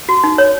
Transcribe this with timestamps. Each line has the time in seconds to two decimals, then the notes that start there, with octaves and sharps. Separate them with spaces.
0.09 F#4
0.24 D#4
0.38 C#5